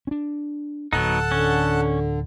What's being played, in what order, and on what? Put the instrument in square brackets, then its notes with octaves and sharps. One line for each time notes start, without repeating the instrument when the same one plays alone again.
[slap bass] C#4 D4
[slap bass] D1 [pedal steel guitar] F#3 B3 D#4 [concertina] A4 F#5 A5
[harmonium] D3 [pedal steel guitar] C#4